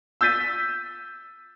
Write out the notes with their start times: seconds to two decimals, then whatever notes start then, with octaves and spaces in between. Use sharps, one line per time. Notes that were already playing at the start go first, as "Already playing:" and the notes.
0.21 E6 G6 A6 B6 D#7